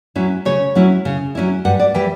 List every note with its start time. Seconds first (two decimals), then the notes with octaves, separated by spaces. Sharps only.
0.15 F#3 C#4 E4
0.45 C#3 C#5
0.75 F#3 C#4 E4
1.05 C#3
1.35 F#3 C#4 E4
1.65 G2 F#5
1.80 D5
1.94 E3 G3 G5